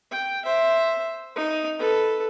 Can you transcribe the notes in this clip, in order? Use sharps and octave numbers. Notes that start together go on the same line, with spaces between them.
G5
C5 E5
D#4
A4 B4